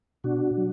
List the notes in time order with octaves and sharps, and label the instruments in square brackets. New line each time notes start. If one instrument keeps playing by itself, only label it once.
[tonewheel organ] B2 D4 F#4
F#3